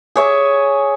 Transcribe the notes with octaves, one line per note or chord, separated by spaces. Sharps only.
G#4 C#5 E5